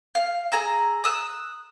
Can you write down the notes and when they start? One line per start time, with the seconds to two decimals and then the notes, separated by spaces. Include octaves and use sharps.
0.15 F5
0.52 G#4 A#5 E6
1.04 D#6 E6 F#6